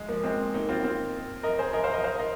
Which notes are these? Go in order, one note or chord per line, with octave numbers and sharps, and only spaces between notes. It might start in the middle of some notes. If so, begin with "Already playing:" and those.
Already playing: G#3
F3 A#3
G#3 C4
A#3 D#4
C4 F4
C4 F4
A#4 D#5
G#4 C5
A#4 D#5
C5 F5
A#4 D#5
C5 F5
A#4 D#5